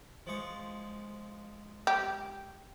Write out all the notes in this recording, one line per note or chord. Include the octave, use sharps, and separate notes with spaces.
F3 G#3 C#6
G4